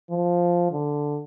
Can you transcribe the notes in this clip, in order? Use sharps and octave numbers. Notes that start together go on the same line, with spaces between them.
F3
D3